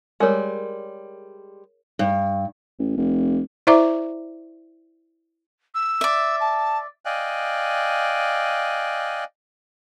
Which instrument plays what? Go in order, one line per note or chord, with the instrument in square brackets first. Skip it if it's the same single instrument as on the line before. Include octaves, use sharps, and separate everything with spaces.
[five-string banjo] G3 G#3 [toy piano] G#4 A#4 C#5
[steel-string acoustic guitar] G2
[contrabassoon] A1
F1
[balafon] E4 C5 D5 E5 A#5 D6
[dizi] E6
[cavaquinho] D5 E5
[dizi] A5
[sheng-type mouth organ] D5 D#5 F5 G5 G#5 F#6